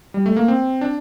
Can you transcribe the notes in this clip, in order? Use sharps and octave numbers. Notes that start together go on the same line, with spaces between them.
G3
A3
A#3
C4
D4